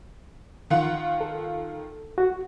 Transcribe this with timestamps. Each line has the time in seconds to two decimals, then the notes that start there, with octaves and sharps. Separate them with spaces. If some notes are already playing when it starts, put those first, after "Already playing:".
0.70 D#3 F4 F#5
1.21 A4
2.18 F#4